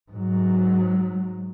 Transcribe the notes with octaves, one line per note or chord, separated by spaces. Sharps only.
G#2 F#3